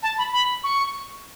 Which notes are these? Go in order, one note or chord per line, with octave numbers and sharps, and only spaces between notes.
A5
B5
B5
C#6